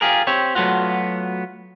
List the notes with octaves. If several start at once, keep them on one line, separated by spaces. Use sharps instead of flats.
F4 G4 G#4 A#4
C4 G4 C#5
F#3 A3 B3 F4 F#4